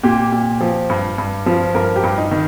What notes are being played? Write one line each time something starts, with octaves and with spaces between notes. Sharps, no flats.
A#2 G4
A#2
F3
G2
G2
F3
G2 A#4
G4
G2
D#4
D#3